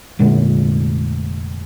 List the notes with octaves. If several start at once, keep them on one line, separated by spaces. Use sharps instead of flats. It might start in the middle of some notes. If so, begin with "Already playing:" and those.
F1 A#2 D3 G#3